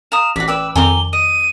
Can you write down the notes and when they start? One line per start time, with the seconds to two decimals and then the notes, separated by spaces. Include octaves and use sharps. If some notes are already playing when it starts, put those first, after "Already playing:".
0.12 F5 A#5 D#6 E7
0.36 A1 F#4 D5 B6
0.48 B4 D5 G5 E6
0.76 F2 D#3 C4 G#5 A#5 D6 G7
1.13 D#5 D#7